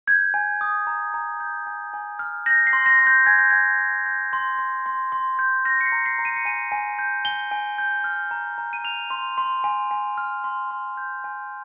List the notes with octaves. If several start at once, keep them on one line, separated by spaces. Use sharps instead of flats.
G6 G#6
G#5
D#6
A#5
A#5
G6
G#5
G#5
F6
G6 A#6
C7
C6
A#6
C6
G6
G#5 G#6
G6
G#5 G#6
G6
G6
C6
C6
C6
C6
G6
F6 A#6
C#7
C7
A#5
C7
A#5
D#7
C#7
G#5 D#7
G#5
G6
G#5 G7
G#5
G6
F6
A#5
A#5
D#7
F6 F7
C6
C6
G#5
G#5
F6
C6
C6
G6
G#5